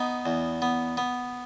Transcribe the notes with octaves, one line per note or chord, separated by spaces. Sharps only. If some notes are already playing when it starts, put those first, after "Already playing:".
Already playing: B3 D#4
E2
B3
B3